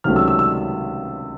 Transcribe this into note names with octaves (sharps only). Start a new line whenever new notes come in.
C#2 C3 D#3 F#3 A3 F6
E6
E6
E6